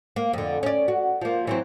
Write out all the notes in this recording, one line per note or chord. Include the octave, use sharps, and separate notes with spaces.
A#3
F2 D3
C#4 D5
F#4
F3 A#3
E3 F#3 C4